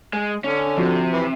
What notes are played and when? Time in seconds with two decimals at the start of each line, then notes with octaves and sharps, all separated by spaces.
0.13 G#3
0.44 D3 C#4
0.77 C3 F3 F4 F#4
1.12 E3